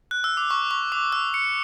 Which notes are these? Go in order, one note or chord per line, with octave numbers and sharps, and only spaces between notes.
F#6
E6
D6
C#6
C#6
D6
E6
C#7